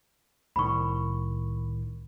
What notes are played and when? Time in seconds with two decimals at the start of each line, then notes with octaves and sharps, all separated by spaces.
0.56 C2 A2 D#3 B5 C#6